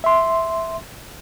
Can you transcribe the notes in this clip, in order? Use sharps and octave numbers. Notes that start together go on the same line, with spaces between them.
E5 C6